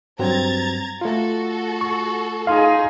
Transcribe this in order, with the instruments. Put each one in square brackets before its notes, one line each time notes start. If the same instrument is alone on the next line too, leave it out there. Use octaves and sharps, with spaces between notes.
[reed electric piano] G2 F#3 C4 [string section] A#5 G#6 A6
[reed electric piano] A3 F4 [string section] F#4 A4
[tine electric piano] C#6
[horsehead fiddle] D#4 G#4 [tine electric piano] F5 C6